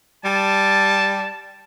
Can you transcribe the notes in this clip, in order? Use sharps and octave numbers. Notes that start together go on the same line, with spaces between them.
G3 A5